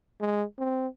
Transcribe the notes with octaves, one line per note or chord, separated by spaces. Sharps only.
G#3
C4